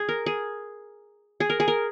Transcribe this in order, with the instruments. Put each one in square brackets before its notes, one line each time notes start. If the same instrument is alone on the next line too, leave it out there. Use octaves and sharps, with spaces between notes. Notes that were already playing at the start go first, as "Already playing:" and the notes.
Already playing: [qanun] G#4
A#4
G#4
G#4
A#4
G#4
A#4